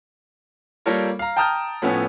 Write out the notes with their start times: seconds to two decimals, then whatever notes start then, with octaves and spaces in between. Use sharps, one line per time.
0.86 G3 A#3 F4 A4 A#4 C#5
1.19 F5 A#5
1.36 G5 A5 A#5 D#6 F6 G6
1.82 A2 F3 B3 C#4 A4